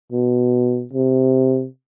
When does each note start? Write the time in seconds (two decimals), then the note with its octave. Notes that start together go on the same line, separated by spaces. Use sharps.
0.12 B2
0.93 C3